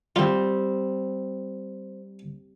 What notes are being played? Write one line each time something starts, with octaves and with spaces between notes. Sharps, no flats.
G3 C4 F4